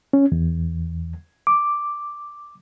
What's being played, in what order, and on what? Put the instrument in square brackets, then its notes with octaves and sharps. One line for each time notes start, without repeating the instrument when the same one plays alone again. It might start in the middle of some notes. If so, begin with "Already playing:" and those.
[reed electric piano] C#4
E2
D6